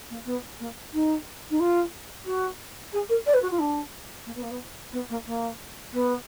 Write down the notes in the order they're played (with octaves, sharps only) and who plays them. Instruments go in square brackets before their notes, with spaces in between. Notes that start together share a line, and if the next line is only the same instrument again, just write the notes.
[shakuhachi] A#3
B3
A#3
D#4
D#4
F4
F#4
G#4
A#4
D5
B4
F#4
F4
D4
A#3
B3
A#3
B3
B3
A#3
A#3
B3